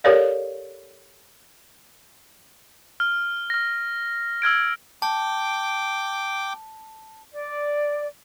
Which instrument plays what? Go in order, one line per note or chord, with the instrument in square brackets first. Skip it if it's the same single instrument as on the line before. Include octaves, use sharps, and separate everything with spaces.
[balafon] G4 A4 A#4 C#5 D5 F5
[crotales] F6
F6 A#6
E6 F6 G#6 D7
[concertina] G5 D6 [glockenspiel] A5
[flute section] D5